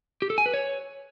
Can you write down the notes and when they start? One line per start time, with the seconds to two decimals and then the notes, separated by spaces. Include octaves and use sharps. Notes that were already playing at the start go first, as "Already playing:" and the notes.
0.22 G4
0.30 A4
0.38 G#5
0.46 B4
0.54 C#5